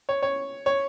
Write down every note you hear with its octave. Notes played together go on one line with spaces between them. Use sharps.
C#5
C#5
C#5